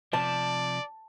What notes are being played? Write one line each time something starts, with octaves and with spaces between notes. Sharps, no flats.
C3 F3 D5 A5